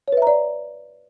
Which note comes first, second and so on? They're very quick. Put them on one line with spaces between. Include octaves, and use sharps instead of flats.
C#5 B4 E5 A#5 D5